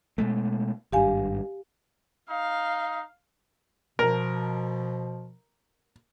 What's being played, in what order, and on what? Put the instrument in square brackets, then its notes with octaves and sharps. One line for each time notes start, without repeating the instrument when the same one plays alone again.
[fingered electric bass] B2 G#3 A3
[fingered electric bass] G#1 G2 [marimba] G4 F5 G#5
[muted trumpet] D#4 [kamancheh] F5
[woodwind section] B2 F3 [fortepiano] A#4